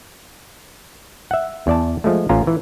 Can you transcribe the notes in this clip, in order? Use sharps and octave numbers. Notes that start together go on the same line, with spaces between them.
E5 F#5
E2 D5 A5
F3 G#3 A3
A1 C#4 F4 A#5
E3